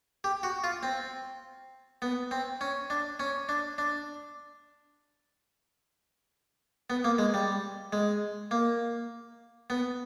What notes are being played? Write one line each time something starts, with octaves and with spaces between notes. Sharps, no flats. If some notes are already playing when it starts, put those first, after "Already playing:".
G4
F#4
F4
C4
B3
C4
C#4
D4
C#4
D4
D4
B3
A#3
G#3
G3
G#3
A#3
B3